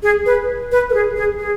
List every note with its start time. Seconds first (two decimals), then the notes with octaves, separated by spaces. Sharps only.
0.03 G#4
0.26 B4
0.72 B4
0.90 A#4
0.94 G#4
1.16 G#4
1.39 G#4